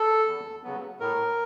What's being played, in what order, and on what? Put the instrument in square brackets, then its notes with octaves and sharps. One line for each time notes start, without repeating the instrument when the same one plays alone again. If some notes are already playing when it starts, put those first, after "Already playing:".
Already playing: [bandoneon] A4
E2
C#3 F#3 B3
A2 A#4